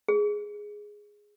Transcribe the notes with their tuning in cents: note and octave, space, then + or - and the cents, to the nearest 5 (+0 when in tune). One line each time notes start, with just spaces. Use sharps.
G#4 +0